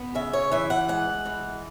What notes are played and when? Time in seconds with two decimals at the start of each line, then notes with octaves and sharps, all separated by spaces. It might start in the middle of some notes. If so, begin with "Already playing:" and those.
Already playing: B3
0.15 C#3 E5
0.33 C#5
0.52 E3 E5
0.70 F#5
0.88 G#3 F#5
1.25 E3